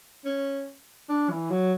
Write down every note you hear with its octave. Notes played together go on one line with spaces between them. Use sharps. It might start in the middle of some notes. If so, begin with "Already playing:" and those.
C#4
D4
E3
F#3